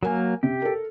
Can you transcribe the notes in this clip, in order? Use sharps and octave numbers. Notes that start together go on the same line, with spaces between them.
F#3 A#3 A#4 G#5
C3 G4
A4 A#4